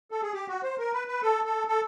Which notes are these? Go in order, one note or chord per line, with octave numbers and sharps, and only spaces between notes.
A4
G#4
G4
F#4
C5
A#4
B4
B4
A4
A4
A4